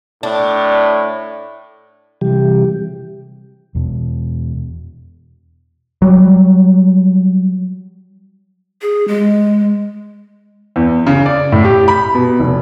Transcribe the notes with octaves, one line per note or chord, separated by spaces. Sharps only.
A2 D4
C3 E3 G3 G4
E2 B2
F#3 G3
G#4
G#3
E2
C#3
D5
A2
G4
B5
B2
F1